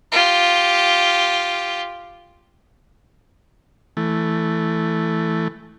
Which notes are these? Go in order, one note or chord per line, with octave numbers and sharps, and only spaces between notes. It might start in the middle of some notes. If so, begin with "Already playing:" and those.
F4 G4
E3 A3